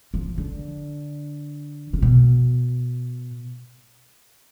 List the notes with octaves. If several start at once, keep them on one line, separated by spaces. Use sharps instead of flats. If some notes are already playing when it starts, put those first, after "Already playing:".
F3
D3
C#3
B2